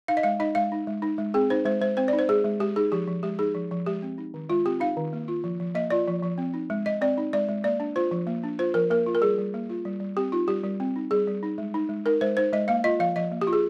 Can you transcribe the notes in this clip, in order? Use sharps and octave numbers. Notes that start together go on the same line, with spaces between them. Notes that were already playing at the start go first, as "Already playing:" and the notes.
D#4 F5
D#5
G#3 F5
D#4 D#5
G#3 F5
D#4
G#3
D#4
G#3
C4 G#4
D#4 C5
G#3 C5
G#3 C5
C4 C5
D#4 D5
C5
G#3 G#4
G#3
G#3 G4
D#4 G#4
F3 G4
F3
G#3 G4
D#4 G#4
F3
F3
G#3 G4
C4
D#4
D#3
G#3 F4
C4 G4
D#4 F5
D#3
A#3
F4
F3
F3
A#3 D#5
F4 D5
F3
F3
C4
D#4
G#3
G#3 D#5
C4 D5
D#4
G#3 D5
G#3
A#3 D5
D4
F4 C5
F3
A#3
D4
F4 C5
F3 A#4
A#3 A#4
F4
A#4
G3 G#4
G3
A#3
F4
G3
G3
C4 G4
D#4 F4
G3 G4
G3
C4
D#4
G3 G#4
G3
D#4
G#3
D#4
G#3
D#4 A#4
G#3 C5
D#4 C5
G#3 D#5
A#3 F5
F4 D#5
F3 F5
F3 D#5
A#3
G4
F4
G#4